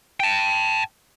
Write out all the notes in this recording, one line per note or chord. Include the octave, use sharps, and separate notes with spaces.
G5 A5